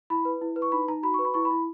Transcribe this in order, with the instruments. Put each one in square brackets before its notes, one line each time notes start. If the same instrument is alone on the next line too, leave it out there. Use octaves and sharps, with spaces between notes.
[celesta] E4 B5
B4
E4
B4
C#6
D#4 B5
D#4 A#5
F#4 B5
B4 C#6
B5
E4 C#6
B5
E4